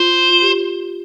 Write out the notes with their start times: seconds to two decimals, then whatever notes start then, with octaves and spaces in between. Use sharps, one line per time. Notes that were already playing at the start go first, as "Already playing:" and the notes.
Already playing: F4 C5
0.30 F4
0.42 G4